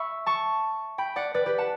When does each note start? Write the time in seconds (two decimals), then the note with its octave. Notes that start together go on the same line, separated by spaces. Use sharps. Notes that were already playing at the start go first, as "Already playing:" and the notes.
Already playing: E5 B5 C#6 E6
0.26 A5 C#6
0.98 G5 B5
1.16 D5 F#5
1.34 B4 D5
1.46 G4 B4
1.58 F#5 A5